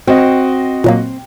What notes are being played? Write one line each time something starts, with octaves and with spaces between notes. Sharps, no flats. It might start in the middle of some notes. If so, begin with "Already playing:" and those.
C4 F#4 D#5
A#2 F#3 A#3